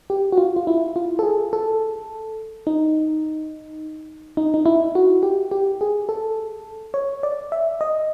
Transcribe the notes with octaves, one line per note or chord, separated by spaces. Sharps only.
G4
F#4
F4
F4
E4
F4
A4
G#4
A4
D#4
D#4
D#4
E4
F#4
G4
G4
G#4
A4
C#5
D5
E5
D#5